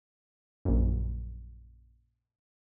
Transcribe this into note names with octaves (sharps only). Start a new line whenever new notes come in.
A#1 F#2